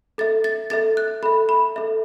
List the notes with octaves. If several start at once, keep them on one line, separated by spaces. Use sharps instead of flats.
A4 E5 A6
A6
A4 E5 A6
F#6
A4 E5 B5
B5
A4 E5